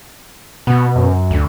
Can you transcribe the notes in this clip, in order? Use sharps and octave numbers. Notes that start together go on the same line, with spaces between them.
B2 B3
F#2
D2